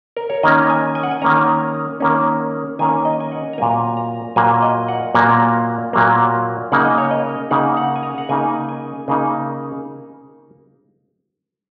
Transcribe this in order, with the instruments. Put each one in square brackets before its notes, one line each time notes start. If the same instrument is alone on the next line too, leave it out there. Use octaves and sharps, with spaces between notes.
[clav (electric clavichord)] A#4
C#5
D#3 A#3 C#4 D#5
G#5
G#5
F#5
G#5
D#3 A#3 C#4 A#5
D#3 A#3 C#4
D#3 A#3 C#4 G#5
D#5
G#5
F#5
A#5
A#2 F#3 A#3 G#5
A#5
A#2 F#3 A#3 G#5
D#5
F#5
A#2 F#3 A#3 A#5
A#2 F#3 A#3
C#3 A#3 D#4 F#5
D#5
C#5
D#5
C#3 A#3 D#4 F#5
F#5
G#5
A#5
F#5
C#3 A#3 D#4 G#5
G#5
C#3 A#3 D#4